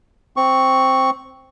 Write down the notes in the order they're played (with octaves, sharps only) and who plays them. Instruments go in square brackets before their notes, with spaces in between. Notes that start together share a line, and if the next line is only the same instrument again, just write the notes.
[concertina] C4 C#6